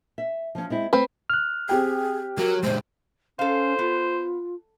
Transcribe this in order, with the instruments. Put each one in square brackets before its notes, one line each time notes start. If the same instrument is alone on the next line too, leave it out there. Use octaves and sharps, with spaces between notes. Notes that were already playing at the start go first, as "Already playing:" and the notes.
[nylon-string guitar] E5
F3 C#4
G#3 C4 E4
[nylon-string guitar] A3 [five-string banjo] C4 B4
[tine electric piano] F6 F#6
[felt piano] C4 G4 G5 [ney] G#4
[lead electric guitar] F#3 [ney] A#4
[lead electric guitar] A#2 G#3 [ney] C5
[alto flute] C#4 [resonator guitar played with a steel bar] A4 F5 [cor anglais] C5
[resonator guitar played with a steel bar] B3 [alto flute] F4